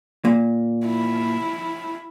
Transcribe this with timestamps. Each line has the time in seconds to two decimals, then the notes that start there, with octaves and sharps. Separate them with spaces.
0.25 A#2
0.86 E4